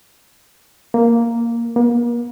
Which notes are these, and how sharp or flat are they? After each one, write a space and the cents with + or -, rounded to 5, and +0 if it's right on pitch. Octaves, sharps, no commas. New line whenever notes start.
A#3 +0
A#3 +40